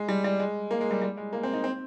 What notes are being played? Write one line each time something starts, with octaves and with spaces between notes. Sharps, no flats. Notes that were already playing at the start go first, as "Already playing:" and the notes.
Already playing: G#3
G3
G3
G#3
A#3
G#3
G3
G3
G#3
A#3
C4
D#4
C4